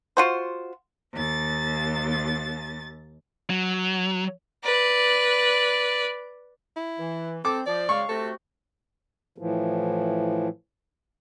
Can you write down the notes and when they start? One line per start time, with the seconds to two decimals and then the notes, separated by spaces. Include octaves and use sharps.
0.17 F4 F#4 C5
1.14 D#2 A6
3.50 F#3
4.64 B4 D5
6.77 E4
6.99 E3
7.45 C4 A4 D6
7.66 F3 D5
7.89 C#3 G#3 F5 C#6
8.09 C3 A3 F#4 A4
9.38 A2 E3 F3